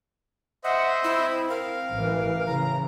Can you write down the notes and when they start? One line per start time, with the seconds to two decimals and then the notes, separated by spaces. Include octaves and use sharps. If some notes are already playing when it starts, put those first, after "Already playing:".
0.64 C5 D#5 E5 F#5
1.04 C4 E4
1.50 A#4 F5
1.93 A1 E3
2.47 C#3 E3 A#5